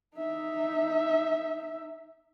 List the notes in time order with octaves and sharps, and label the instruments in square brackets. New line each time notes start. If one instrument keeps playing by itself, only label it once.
[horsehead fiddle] D#4 E5